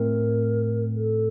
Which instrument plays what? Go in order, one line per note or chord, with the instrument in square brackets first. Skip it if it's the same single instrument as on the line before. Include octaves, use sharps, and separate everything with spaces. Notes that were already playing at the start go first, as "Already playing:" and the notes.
Already playing: [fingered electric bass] A2 A3 C4 [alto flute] A#4
[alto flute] A4